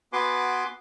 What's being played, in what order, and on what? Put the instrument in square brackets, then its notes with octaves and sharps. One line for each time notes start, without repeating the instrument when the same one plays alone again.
[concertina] B3 F#4 B4 G#5 C6 D6